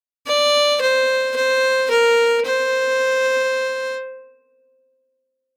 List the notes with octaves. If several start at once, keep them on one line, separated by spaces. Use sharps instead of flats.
D5
C5
C5
A#4
C5